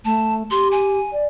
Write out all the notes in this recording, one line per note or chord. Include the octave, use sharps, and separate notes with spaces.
A3 A5
G4 C6
G#5
D5